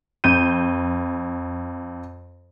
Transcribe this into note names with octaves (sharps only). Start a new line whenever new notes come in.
F2 G6 D#7